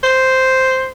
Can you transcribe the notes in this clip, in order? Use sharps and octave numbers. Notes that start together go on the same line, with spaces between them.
C5